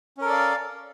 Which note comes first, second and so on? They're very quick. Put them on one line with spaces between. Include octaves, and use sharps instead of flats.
C#4 A#4 A4 D5 F5